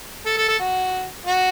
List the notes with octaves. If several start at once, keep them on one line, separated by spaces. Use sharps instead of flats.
A4
A4
A4
F#4
F#4